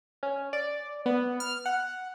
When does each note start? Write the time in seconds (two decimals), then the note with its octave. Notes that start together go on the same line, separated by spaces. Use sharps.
0.23 C#4
0.53 D5
1.06 B3
1.40 F6
1.66 F#5